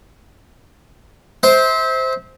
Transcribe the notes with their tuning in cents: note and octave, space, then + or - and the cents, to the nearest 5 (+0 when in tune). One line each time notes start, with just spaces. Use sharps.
C5 +0 E5 -30